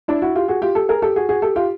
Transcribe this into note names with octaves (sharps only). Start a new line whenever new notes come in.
D4 E4
E4 F#4
F4 G4
F#4 G#4
F4 G4
G4 A4
G#4 A#4
G4 A4
F#4 G#4
F#4 G#4
G4 A4
F4 G4